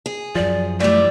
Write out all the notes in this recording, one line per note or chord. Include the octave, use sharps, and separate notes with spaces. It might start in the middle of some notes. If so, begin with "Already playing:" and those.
G#4
F#2 F3 D5
E3 G3 A3 D5